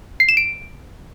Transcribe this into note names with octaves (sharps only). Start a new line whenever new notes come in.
C7
E7
D7